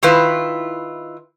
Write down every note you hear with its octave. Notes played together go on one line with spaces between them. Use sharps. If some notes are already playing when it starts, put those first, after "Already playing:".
D#3 E4 F4 B4